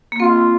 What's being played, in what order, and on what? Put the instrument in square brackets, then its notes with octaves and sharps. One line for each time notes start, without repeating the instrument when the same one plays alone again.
[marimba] A#3
[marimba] C4 [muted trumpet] F4